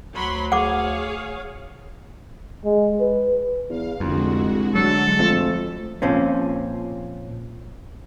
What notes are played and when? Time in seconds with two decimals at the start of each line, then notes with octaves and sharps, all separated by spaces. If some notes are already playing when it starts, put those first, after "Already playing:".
0.14 D2 F#3 B5 C6
0.52 G#4 C#5 F5 F#5 D6
2.65 G#3
3.00 B4
3.70 E2 F5
4.00 C2 F2 D3 G#3 F#4
4.75 D2 F#3 A4
5.19 F2 F3 A3
6.02 A#2 F3 C4 C#4